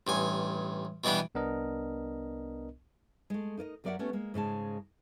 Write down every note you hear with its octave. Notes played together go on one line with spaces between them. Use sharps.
A1 G2 G#5
B2 E3 G3 B3 D4
C2 B3 D4 A#4 D#5
G#3 A3
D#4 A#4 D5 D#5
F#2 F#3 A#4 D5 E5 F#5
A3 B3 C#4 G4
G#3 A#3
G#2 C#3 G#3 A5